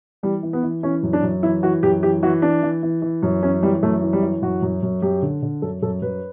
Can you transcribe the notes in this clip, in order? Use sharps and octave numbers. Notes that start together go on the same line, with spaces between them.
E3 G3
E3
B3
E3
E3 C#4
F#2
D4
F#2
E3 E4
E3 F#4
F#2 G4
E3 G4
E3 F#4
E3 D4
E3
E3
E3
F#2
E3 C#4
E3 G3
F#2 A3
E3
G3
E3
F#2 F#4
F#2
F#2
F#2 G4
D3
D3
F#2 A4
F#2 A4
F#2 B4